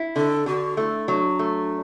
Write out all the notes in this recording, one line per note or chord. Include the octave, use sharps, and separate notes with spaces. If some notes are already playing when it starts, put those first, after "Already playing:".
Already playing: E4
D3 A4
D3 F#4
A3 E4
F#3 D4
A3